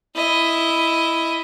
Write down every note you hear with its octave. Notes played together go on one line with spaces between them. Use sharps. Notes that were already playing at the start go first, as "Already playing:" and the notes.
E4 D#5